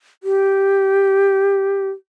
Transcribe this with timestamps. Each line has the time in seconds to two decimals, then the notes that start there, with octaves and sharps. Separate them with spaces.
0.23 G4